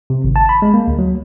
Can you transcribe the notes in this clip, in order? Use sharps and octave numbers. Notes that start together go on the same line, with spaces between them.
C3
G#1
A5
B5
G#3
A#3
D2
F#3